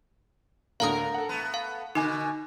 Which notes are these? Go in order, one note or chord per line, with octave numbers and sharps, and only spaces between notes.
D2 A2 D3 A#4 F5 A#5 D#6
A4 F#5
A3 B3
F5
B2 D3 D#4 G#5 D6